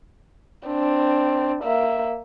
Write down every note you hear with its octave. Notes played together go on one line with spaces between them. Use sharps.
C4 D4
A#3 E5